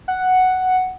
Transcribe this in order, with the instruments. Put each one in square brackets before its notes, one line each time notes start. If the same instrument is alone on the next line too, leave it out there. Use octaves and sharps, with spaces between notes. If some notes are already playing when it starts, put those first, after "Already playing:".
[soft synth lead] F#5